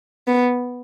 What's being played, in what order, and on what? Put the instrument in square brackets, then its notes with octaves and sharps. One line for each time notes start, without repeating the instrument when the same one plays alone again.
[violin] B3